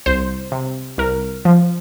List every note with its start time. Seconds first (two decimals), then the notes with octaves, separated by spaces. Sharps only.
0.06 C2 C5
0.52 C3
0.98 C2 A#4
1.45 F3